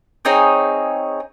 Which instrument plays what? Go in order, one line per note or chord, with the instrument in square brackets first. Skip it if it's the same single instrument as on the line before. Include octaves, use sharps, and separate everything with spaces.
[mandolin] C4 D#4 G#4 C#5